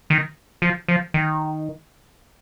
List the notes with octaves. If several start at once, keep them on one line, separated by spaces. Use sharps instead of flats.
D#3
F3
F3
D#3